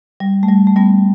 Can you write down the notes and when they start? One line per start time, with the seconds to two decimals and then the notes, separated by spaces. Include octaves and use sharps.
0.20 G3
0.43 A3
0.48 G3
0.67 A3
0.76 G3 B3